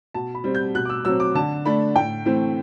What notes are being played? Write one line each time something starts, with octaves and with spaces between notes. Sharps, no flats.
B2 A5
B5
G3 C4
G6
B2 F#6
D6
E6
F#3 C4 E6
D6
D3 A5
A3 D4 B5
A2 G5
E3 A3 C4